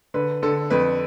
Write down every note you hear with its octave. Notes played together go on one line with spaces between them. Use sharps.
D3 B4
D3 A4
F2 B4